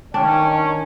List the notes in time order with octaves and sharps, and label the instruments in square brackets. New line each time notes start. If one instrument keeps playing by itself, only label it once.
[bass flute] D#3 [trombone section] C#4 [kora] D4 [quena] G5